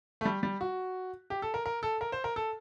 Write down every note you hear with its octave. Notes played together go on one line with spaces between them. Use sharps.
A3
G3
G3
F#4
G4
A4
A#4
A#4
A4
A#4
C5
A#4
A4